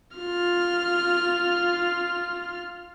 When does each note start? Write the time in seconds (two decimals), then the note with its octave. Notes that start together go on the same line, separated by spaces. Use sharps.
0.17 F4 F6